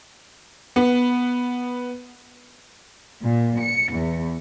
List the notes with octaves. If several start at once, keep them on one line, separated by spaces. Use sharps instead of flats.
B3
A#2
C#7
E2